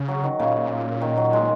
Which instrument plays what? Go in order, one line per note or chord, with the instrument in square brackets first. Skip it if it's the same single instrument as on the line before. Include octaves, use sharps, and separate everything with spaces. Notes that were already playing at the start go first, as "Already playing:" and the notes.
Already playing: [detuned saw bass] C#3
[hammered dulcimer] F#3
D#3
[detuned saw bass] A#2 [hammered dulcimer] C#3
[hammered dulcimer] D#3
F#3
G#3